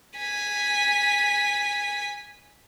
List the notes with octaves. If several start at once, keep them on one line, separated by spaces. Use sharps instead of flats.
G#5 B6